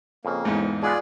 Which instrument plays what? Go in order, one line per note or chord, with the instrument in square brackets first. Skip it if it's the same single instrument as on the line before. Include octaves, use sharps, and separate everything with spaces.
[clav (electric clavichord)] F2 C#3 [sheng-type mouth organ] A#3
[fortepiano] E2 G#2
[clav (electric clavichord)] G#3 B3 [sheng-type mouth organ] F4 G#4 D5